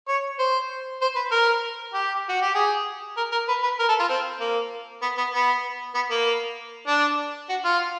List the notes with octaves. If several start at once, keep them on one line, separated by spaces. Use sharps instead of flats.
C#5
C5
C5
B4
A#4
G4
F#4
G4
G#4
A#4
A#4
B4
B4
A#4
A4
F4
C4
A#3
B3
B3
B3
B3
A#3
D4
F#4
F4